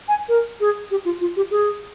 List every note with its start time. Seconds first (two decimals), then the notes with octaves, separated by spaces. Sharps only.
0.08 G#5
0.29 A#4
0.60 G#4
0.91 G4
1.05 F4
1.20 F4
1.37 G4
1.51 G#4